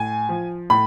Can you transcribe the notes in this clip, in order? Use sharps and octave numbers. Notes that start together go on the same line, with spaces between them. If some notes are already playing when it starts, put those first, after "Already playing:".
Already playing: A2 G#5
F3
A2 B5